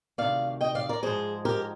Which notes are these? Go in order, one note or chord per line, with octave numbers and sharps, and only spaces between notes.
D2 C3 D#3 D5 F5
D#5 G5
D5 F5
A#4 D5
G#2 F3 G#3 G#4 C5
G4 A#4